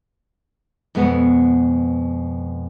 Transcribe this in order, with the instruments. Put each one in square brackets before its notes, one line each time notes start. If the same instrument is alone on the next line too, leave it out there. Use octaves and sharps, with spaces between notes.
[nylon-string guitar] F2 B2 G#3 B3 B4 F#5